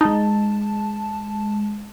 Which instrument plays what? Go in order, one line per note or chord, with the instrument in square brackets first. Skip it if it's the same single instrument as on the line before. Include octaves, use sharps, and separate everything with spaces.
[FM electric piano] G#3 A5 [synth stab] D#4